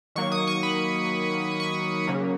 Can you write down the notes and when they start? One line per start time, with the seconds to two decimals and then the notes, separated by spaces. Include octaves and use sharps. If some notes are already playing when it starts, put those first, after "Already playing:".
0.16 D#3 F#3 A#3 C#6
0.32 D#6
0.47 C#6
0.63 B5
1.60 C#6
2.07 C#3 F#3 A#3